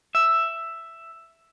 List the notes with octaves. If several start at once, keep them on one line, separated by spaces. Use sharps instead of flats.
E5